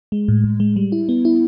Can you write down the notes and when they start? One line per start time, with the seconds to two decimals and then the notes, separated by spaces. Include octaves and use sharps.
0.12 G#3
0.28 A2
0.44 A2
0.60 G#3
0.76 G3
0.92 E4
1.09 B3
1.25 E4